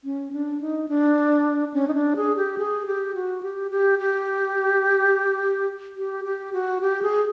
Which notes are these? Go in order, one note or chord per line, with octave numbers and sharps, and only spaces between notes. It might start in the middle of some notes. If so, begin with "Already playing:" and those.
C#4
D4
D#4
D4
C#4
D#4
D4
G#4
G4
G#4
G4
F#4
G4
G4
G4
G4
G4
F#4
G4
G#4